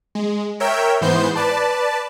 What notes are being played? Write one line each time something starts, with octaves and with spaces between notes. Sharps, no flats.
G#3
A#4 C#5 E5 G5
G#2 E3 B3 C5 G6 C7
B4 D5 A5